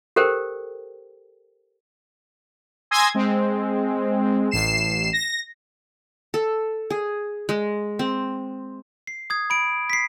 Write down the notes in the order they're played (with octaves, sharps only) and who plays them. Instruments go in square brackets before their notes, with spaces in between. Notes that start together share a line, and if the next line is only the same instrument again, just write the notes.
[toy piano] G4 A4 A#4 C5 G5
[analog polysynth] G#5 C6 D#6 E6 G#6 A#6
G#3 C4
A1 C7 E7
A#6
[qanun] A4
G#4
G#3
C4
[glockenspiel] C7
D#6 G#6
B5 D7
B6 C7